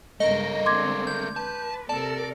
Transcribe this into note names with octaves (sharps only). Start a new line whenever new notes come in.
G2 C#3 G#3 A3 A#4 D#5
D3 G#3 C4 C6 D6 G#6
G6
B4 A5
C3 A4 A#4 D5 A5